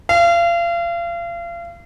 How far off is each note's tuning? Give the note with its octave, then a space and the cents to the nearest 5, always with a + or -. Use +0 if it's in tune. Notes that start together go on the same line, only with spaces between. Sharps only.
F5 -35